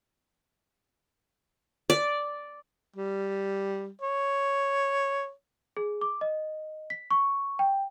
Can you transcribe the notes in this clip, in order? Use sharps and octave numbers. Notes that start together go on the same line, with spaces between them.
D5
G3
C#5
G#4
D6
D#5
B6
C#6
G5